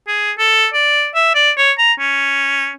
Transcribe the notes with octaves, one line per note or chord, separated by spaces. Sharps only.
G#4
A4
D5
E5
D5
C#5
A#5
C#4